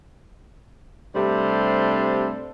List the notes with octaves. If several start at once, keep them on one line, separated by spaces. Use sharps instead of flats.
C3 G3 A3 D4 A4 C5